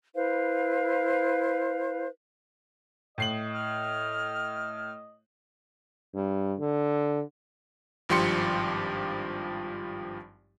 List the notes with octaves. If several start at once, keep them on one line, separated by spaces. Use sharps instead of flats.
E4 B4 C5 F5
A2 D#5 C7 F#7
F6
G2
D3
G#1 G2 F3 G4 C6 C#7